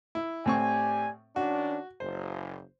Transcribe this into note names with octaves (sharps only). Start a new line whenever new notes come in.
E4
A2 C4 G4 D5 G#5 C#6
D#3 C#4 D4 F#4
F#1 C5